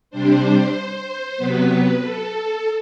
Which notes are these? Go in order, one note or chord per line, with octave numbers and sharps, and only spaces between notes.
C3 G3 D4 C5
C3 F#3 B3 B4
A4